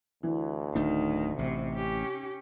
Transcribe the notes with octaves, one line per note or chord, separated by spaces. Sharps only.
D2 E3
D1 D#3 A3 D4 D#4
A1 C3
C#4 G4